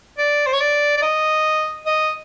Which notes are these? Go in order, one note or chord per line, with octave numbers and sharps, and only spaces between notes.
D5
C5
C#5
D5
D5
D#5
D#5